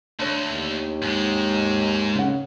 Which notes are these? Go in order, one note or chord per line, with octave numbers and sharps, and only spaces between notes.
D2 D4 C#5
D#2
G#2 G#3
C#3 C#4 F#5